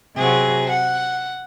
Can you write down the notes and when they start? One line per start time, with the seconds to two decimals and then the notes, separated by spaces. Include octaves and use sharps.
0.16 C3 F#3 G#4
0.69 F#5